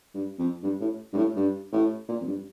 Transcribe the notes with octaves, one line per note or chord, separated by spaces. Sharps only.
G2
F2
G2
A2
G2
A2
G2
A2
A#2
F2
G2